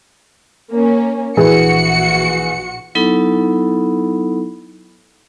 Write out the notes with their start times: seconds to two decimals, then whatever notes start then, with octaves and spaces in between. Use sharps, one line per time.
0.73 A#3 C#4
1.37 A#1 E3 F#4 G#4 C#7
2.95 F#3 B3 D#4 E4 A4 B5